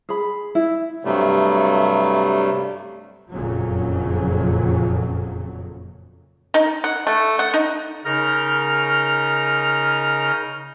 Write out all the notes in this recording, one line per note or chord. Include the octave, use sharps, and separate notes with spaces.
G#4 B5
E4
G2 C3 F#3 G3 A3
F#1 F2 A#2 C#3 F#3
D#4
F#5
A3
F#5
D#4
C#3 D#4 A#4 D#5 A#5 F6